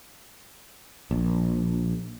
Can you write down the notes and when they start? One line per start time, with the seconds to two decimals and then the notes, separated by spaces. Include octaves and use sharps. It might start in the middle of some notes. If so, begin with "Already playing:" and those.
1.11 A#1